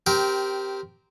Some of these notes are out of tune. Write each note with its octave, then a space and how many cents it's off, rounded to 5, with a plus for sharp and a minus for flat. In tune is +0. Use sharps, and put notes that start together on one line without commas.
C4 -15 G4 +0 A#4 +0